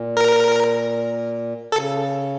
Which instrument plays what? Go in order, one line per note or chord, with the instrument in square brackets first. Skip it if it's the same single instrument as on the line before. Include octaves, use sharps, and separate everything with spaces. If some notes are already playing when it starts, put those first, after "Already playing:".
Already playing: [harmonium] A#2
[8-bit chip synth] A#4
[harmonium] C#3 [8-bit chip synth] A4